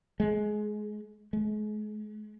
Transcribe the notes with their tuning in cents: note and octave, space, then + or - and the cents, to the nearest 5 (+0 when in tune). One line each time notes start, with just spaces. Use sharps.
G#3 +20
G#3 +35